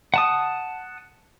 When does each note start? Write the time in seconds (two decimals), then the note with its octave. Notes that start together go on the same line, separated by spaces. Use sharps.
0.14 F#5 A5 D#6